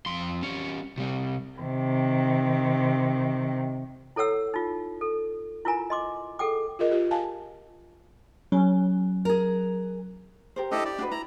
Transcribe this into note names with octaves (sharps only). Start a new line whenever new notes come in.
F2 C6
G3 C#4
C3 G3
C3 D#3
E4 A4 C#5 F#5 E6
D#4 F4
A4
E4 F4 A#4 G#5 A#5
D#5 C6 D6
G#4 A4 F#5 G5 D6
F4 G#4 A#4 D#5
F4 G4
F5 G#5 A5
F#3 C#4
G#4 A#4
G4 A#4 C5
D4 E4 G4 A4 D#5
G4 D5
D4 F#4 B4
E4 A#5